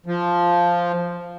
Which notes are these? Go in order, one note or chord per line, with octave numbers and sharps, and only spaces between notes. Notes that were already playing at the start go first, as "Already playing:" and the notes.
F3